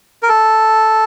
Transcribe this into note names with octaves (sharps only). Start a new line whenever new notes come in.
A#4
A4